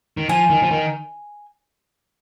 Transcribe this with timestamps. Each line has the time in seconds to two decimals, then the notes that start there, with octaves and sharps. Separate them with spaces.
0.17 D#3
0.29 F3 G#5
0.50 D#3
0.62 F3
0.71 D#3